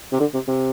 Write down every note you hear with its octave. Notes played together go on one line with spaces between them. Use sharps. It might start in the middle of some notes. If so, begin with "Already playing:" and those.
C3
D3
C3
C3